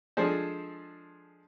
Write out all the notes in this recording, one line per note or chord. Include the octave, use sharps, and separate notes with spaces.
F3 G#3 D4 G#4 A4 C5